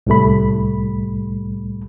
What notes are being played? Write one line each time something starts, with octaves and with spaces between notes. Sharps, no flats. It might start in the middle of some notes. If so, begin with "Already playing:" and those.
C2 A2 G3 A3 B5